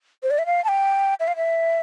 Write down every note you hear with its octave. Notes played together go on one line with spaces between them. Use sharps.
C5
D5
E5
F5
A5
G5
E5
F5
E5